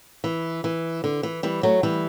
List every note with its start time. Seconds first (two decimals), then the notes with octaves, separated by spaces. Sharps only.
0.24 E3
0.64 E3
1.04 D3
1.23 E3
1.43 E3 G3
1.63 F#3 A3
1.83 E3 G3